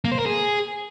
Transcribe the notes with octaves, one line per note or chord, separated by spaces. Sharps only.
A#3
C5
A#4
G#4